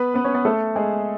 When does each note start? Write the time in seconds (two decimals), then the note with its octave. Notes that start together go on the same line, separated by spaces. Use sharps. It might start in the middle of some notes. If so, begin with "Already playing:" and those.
Already playing: B3 B4
0.14 B3 B4
0.24 C#4 C#5
0.34 B3 B4
0.45 A3 A4
0.76 G#3 G#4